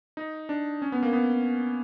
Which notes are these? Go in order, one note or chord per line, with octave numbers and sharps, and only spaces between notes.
D#4
D4
C#4
B3
A#3
B3